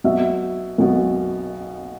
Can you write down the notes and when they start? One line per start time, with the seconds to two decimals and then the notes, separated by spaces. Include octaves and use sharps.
0.04 B1 B2 E5
0.78 B1 B2